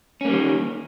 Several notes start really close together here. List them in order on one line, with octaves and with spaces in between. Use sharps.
C#4 A#3 G3 D#3